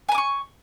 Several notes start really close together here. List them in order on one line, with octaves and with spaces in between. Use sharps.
G#5 A#5 D6 C#6